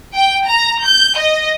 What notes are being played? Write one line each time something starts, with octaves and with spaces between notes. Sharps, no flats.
G5
A#5
G6
D#5